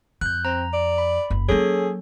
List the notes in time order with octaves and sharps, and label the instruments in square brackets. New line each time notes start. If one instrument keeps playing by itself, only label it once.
[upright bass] F2 [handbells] F#6 G6
[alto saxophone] C4 [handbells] A#5
[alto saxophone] D5
[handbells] B5
[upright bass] F#1
[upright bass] F#3 A#3 [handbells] C#4 A4 C#5 [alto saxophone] G#4